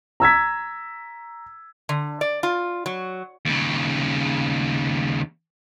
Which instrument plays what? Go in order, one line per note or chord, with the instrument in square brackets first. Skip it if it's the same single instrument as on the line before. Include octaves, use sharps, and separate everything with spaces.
[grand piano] A#5 E6 G#6 B6
[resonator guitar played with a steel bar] D3
D5
F4
F#3
[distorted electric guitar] D#2 C#3